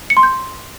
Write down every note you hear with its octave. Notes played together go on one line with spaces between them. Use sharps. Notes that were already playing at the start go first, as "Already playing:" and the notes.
C#7
C6
G6